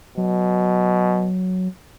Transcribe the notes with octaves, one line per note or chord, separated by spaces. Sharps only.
B2 F#3